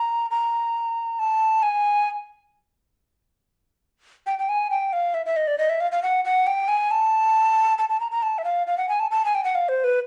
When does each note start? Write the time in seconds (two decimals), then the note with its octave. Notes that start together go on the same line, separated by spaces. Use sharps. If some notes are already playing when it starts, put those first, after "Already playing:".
Already playing: A#5
0.31 A#5
1.19 A5
1.63 G#5
4.27 G5
4.39 G5
4.49 G#5
4.70 G5
4.93 F5
5.14 E5
5.26 E5
5.36 D#5
5.47 D5
5.58 D#5
5.70 E5
5.81 F5
5.92 F5
6.03 F#5
6.25 F#5
6.47 G5
6.68 G#5
6.91 A5
7.78 A5
7.89 A5
8.00 A#5
8.11 A#5
8.23 A5
8.38 E5
8.44 F5
8.67 F5
8.78 F#5
8.89 G#5
9.00 A5
9.11 A5
9.25 G#5
9.35 G5
9.44 F#5
9.55 F5
9.69 C5
9.84 B4